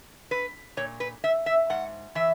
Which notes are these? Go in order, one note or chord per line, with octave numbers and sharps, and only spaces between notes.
B4
A#2 C#5
B4
E5
E5
G#2 F#5
E3 E5